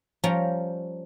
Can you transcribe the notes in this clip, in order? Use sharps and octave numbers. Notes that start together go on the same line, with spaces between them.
F3 G3 C#4 A#4 G5 A#5